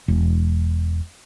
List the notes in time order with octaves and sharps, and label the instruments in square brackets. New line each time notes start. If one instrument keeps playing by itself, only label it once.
[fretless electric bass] E1